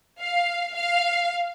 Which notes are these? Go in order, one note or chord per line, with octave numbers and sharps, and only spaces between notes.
F5
F5